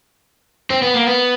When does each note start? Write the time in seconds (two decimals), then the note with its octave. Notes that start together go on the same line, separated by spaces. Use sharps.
0.70 C4
0.82 B3
0.94 A#3
1.06 B3